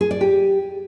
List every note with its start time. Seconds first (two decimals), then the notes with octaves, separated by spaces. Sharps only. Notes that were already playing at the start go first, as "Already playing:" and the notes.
0.01 G#4
0.11 D5
0.21 G4